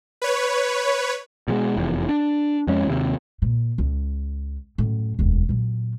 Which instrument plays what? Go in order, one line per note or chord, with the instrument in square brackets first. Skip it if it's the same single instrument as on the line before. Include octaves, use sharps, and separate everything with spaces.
[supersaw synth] B4 C#5
[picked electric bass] B2 G3 G#3
F1 E2
D4
F2 G#3 C#4
D#2 C3
[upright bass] A#2
C#2
F#2 A2
E1 D2
A#2 F#3